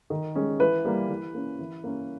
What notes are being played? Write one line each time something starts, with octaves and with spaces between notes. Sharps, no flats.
D#3
G#3 C#4
E3 B4
G3 A#3
E3
A#3 C#4
E3
A#3 C#4